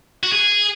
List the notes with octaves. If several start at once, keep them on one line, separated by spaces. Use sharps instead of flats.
F#4
G#4